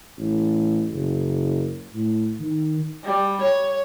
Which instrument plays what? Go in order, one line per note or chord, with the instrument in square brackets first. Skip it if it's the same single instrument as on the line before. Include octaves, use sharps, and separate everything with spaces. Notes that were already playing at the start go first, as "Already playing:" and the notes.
[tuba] A1
F#1
A2
D#3
[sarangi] G3
C#5